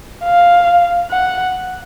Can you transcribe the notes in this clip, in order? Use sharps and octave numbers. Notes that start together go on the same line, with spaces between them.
F5
F#5